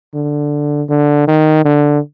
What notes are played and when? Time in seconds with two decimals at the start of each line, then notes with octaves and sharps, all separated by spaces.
0.14 D3
0.89 D3
1.28 D#3
1.65 D3